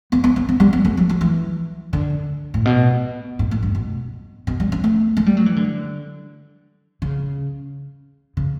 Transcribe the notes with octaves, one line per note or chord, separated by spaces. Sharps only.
B3
B3
B3
B3
G3
B3
A3
F#3
F#3
E3
D3
A2
B2
A2
A2
G2
B2
B2
G3
C#4
A3
A3
G3
F#3
E3
D3
C#3
C#3